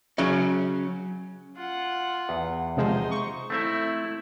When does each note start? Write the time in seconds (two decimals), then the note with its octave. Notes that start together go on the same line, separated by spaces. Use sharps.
0.18 C#3 F#3 C#4
1.56 F4 F#5
2.29 E2
2.77 C3 F3 G#3 D#4 C5
3.11 C#6
3.50 A3 C4 E4 E5